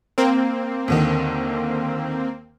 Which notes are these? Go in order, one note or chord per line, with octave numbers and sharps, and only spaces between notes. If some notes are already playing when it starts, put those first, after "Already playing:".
A#3 C4
D#2 D3 D#3